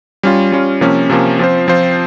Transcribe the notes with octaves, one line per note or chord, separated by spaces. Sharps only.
G3 C#4 F4
G3 C#4 F4
C3 F3 A#3 C#4
C3 F3 A#3 C#4
F3 C4 F4 C5
F3 C4 F4 C5